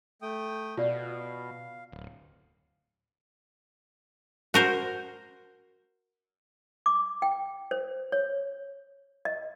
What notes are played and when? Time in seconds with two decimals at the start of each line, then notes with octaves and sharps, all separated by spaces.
0.22 A3 G5 D#6
0.77 B2 F4 D5 F5
1.92 D1
4.54 F#4 A#4 C5
6.86 D6
7.22 G5
7.71 C5
8.12 C#5
9.25 D#5